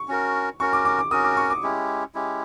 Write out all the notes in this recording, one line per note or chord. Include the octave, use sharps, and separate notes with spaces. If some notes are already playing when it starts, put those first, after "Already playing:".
Already playing: C#6
C#4 F#4 A#4
C#4 F#4 A#4 C#6
D6
D6
D6
C#4 F#4 A#4 D#6
D6
C#6
D6
G#3 C#4 E4 G4
G#3 C#4 E4 G4